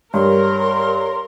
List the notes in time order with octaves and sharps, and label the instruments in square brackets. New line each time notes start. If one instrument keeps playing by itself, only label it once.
[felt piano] G2 [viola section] A#4 [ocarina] C#5 [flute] C6